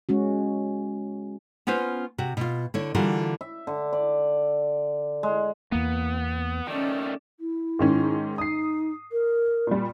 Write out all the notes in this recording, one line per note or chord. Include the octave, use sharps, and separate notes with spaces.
G#3 C#4 F#4
B3 C#4 F4 B4 C5
C3 F#4
B2 F4
D3 E4 C#5
D3 E3 G3 F4 F#4 A#4
E5
D3
D5
G#3
E2 A#3 B3
D#3 A3 C#4 D5
E4
G#2 D#3 C#4
D#4 D#6 C7
A#4
A#2 G3